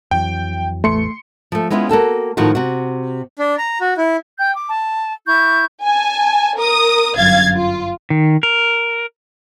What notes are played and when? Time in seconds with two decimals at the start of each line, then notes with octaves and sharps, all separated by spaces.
0.11 F2 E3 F#3 G5
0.84 A1 E2 E3 A3 C6 C#7
1.52 F3 A3
1.70 G#3 B3 C#4 E4 F4
1.89 A#3 F#4 A4 G5
2.37 A2 D#3 F3 F4 F#4
2.55 C3 F#4
3.39 D4
3.58 A#5
3.81 F#4
3.98 E4
4.38 G5 G6
4.54 D6
4.70 A5
5.27 E4 C#6 G6
5.83 G#5 A5
6.58 A#4 D#6
7.16 G1 F#2 F5 G#6 A6
7.56 F4
8.10 D#3
8.43 A#4